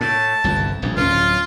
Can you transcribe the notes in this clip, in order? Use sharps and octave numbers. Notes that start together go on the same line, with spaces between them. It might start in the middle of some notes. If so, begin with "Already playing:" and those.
A2 A5
G1 C2 F2
D#1 A#1 F2
D1 C#4 F4